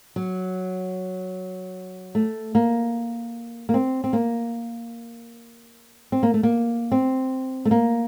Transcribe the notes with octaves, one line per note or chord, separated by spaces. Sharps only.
F#3
A3
A#3
A#3
C4
C4
A#3
C4
A#3
A3
A#3
C4
A3
A#3